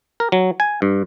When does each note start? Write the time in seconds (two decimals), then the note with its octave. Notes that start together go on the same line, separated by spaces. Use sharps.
0.20 A#4
0.32 F#3
0.60 G#5
0.82 G2